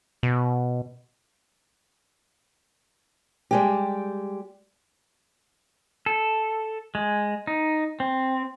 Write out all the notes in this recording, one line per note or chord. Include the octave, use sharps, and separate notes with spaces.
B2
G3 G#3 G4
A4
G#3
D#4
C4